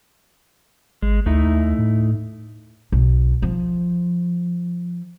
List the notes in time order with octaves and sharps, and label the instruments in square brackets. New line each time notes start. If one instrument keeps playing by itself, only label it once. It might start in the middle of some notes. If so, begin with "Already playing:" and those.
[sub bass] G#1 [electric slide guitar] G#3
[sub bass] D2 [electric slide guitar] A3 D#4 E4
[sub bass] D#2
A2
[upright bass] B1
F3